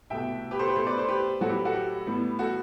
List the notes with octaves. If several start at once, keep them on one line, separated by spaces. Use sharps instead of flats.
C2 B2 A3 E5 G5
G4 B4
A4 C5
G4 B4
B2 A3 A4 C5
B4 D5
A4 C5
G4 B4
A2 F#3 A3 F#4 A4
G4 B4
F#4 A4
G4
A2 G3 B3
F#4 A4